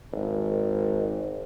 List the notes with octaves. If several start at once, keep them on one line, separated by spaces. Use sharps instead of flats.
G#1